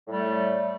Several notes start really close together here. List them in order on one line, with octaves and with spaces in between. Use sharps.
A2 G3 A3